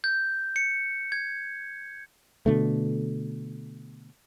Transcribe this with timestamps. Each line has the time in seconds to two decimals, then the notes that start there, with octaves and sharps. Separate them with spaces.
0.04 G6
0.56 C#7
1.12 G#6
2.46 B2 D3 A3